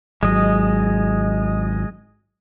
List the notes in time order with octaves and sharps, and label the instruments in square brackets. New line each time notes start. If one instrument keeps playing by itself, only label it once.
[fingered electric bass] G#1 F#3 [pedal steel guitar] G#3 D#5